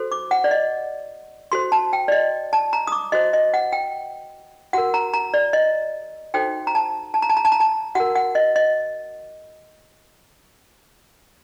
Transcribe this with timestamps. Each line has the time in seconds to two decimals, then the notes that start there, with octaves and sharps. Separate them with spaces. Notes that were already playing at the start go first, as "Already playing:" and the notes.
Already playing: F#4 A4 C5
0.12 D6
0.31 F#5
0.44 D5
0.51 D#5
1.52 F#4 A4 C5 C6
1.72 A5
1.93 G5
2.08 D5
2.12 D#5
2.53 A5
2.73 A#5
2.87 D#6
2.92 D6
3.12 F#4 C5 D#5
3.33 D#5
3.54 F#5
3.72 G5
4.73 F#4 A#4 F#5
4.94 A#5
5.13 A#5
5.34 D5
5.53 D#5
6.34 D#4 F#4 A4 C5 G5
6.67 A#5
6.75 A5
7.14 A5
7.22 A#5
7.29 A5
7.37 A#5
7.45 A5
7.52 A#5
7.60 A5
7.95 F#4 A#4 F#5
8.16 F#5
8.35 D#5
8.56 D#5